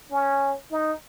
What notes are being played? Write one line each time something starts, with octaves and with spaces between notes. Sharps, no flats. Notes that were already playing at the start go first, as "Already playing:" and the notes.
C#4
D#4